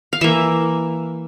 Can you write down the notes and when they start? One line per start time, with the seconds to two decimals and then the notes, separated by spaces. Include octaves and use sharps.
0.13 F5
0.21 E3 A#3 E5